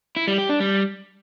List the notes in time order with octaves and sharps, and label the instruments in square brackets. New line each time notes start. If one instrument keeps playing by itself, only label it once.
[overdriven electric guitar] E4
G3
G4
D4
G3